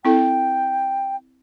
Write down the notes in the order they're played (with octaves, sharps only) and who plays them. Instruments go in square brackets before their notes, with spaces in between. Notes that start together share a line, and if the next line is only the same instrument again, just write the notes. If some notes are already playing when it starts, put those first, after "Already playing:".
[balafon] C4 E4 A4 [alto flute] G5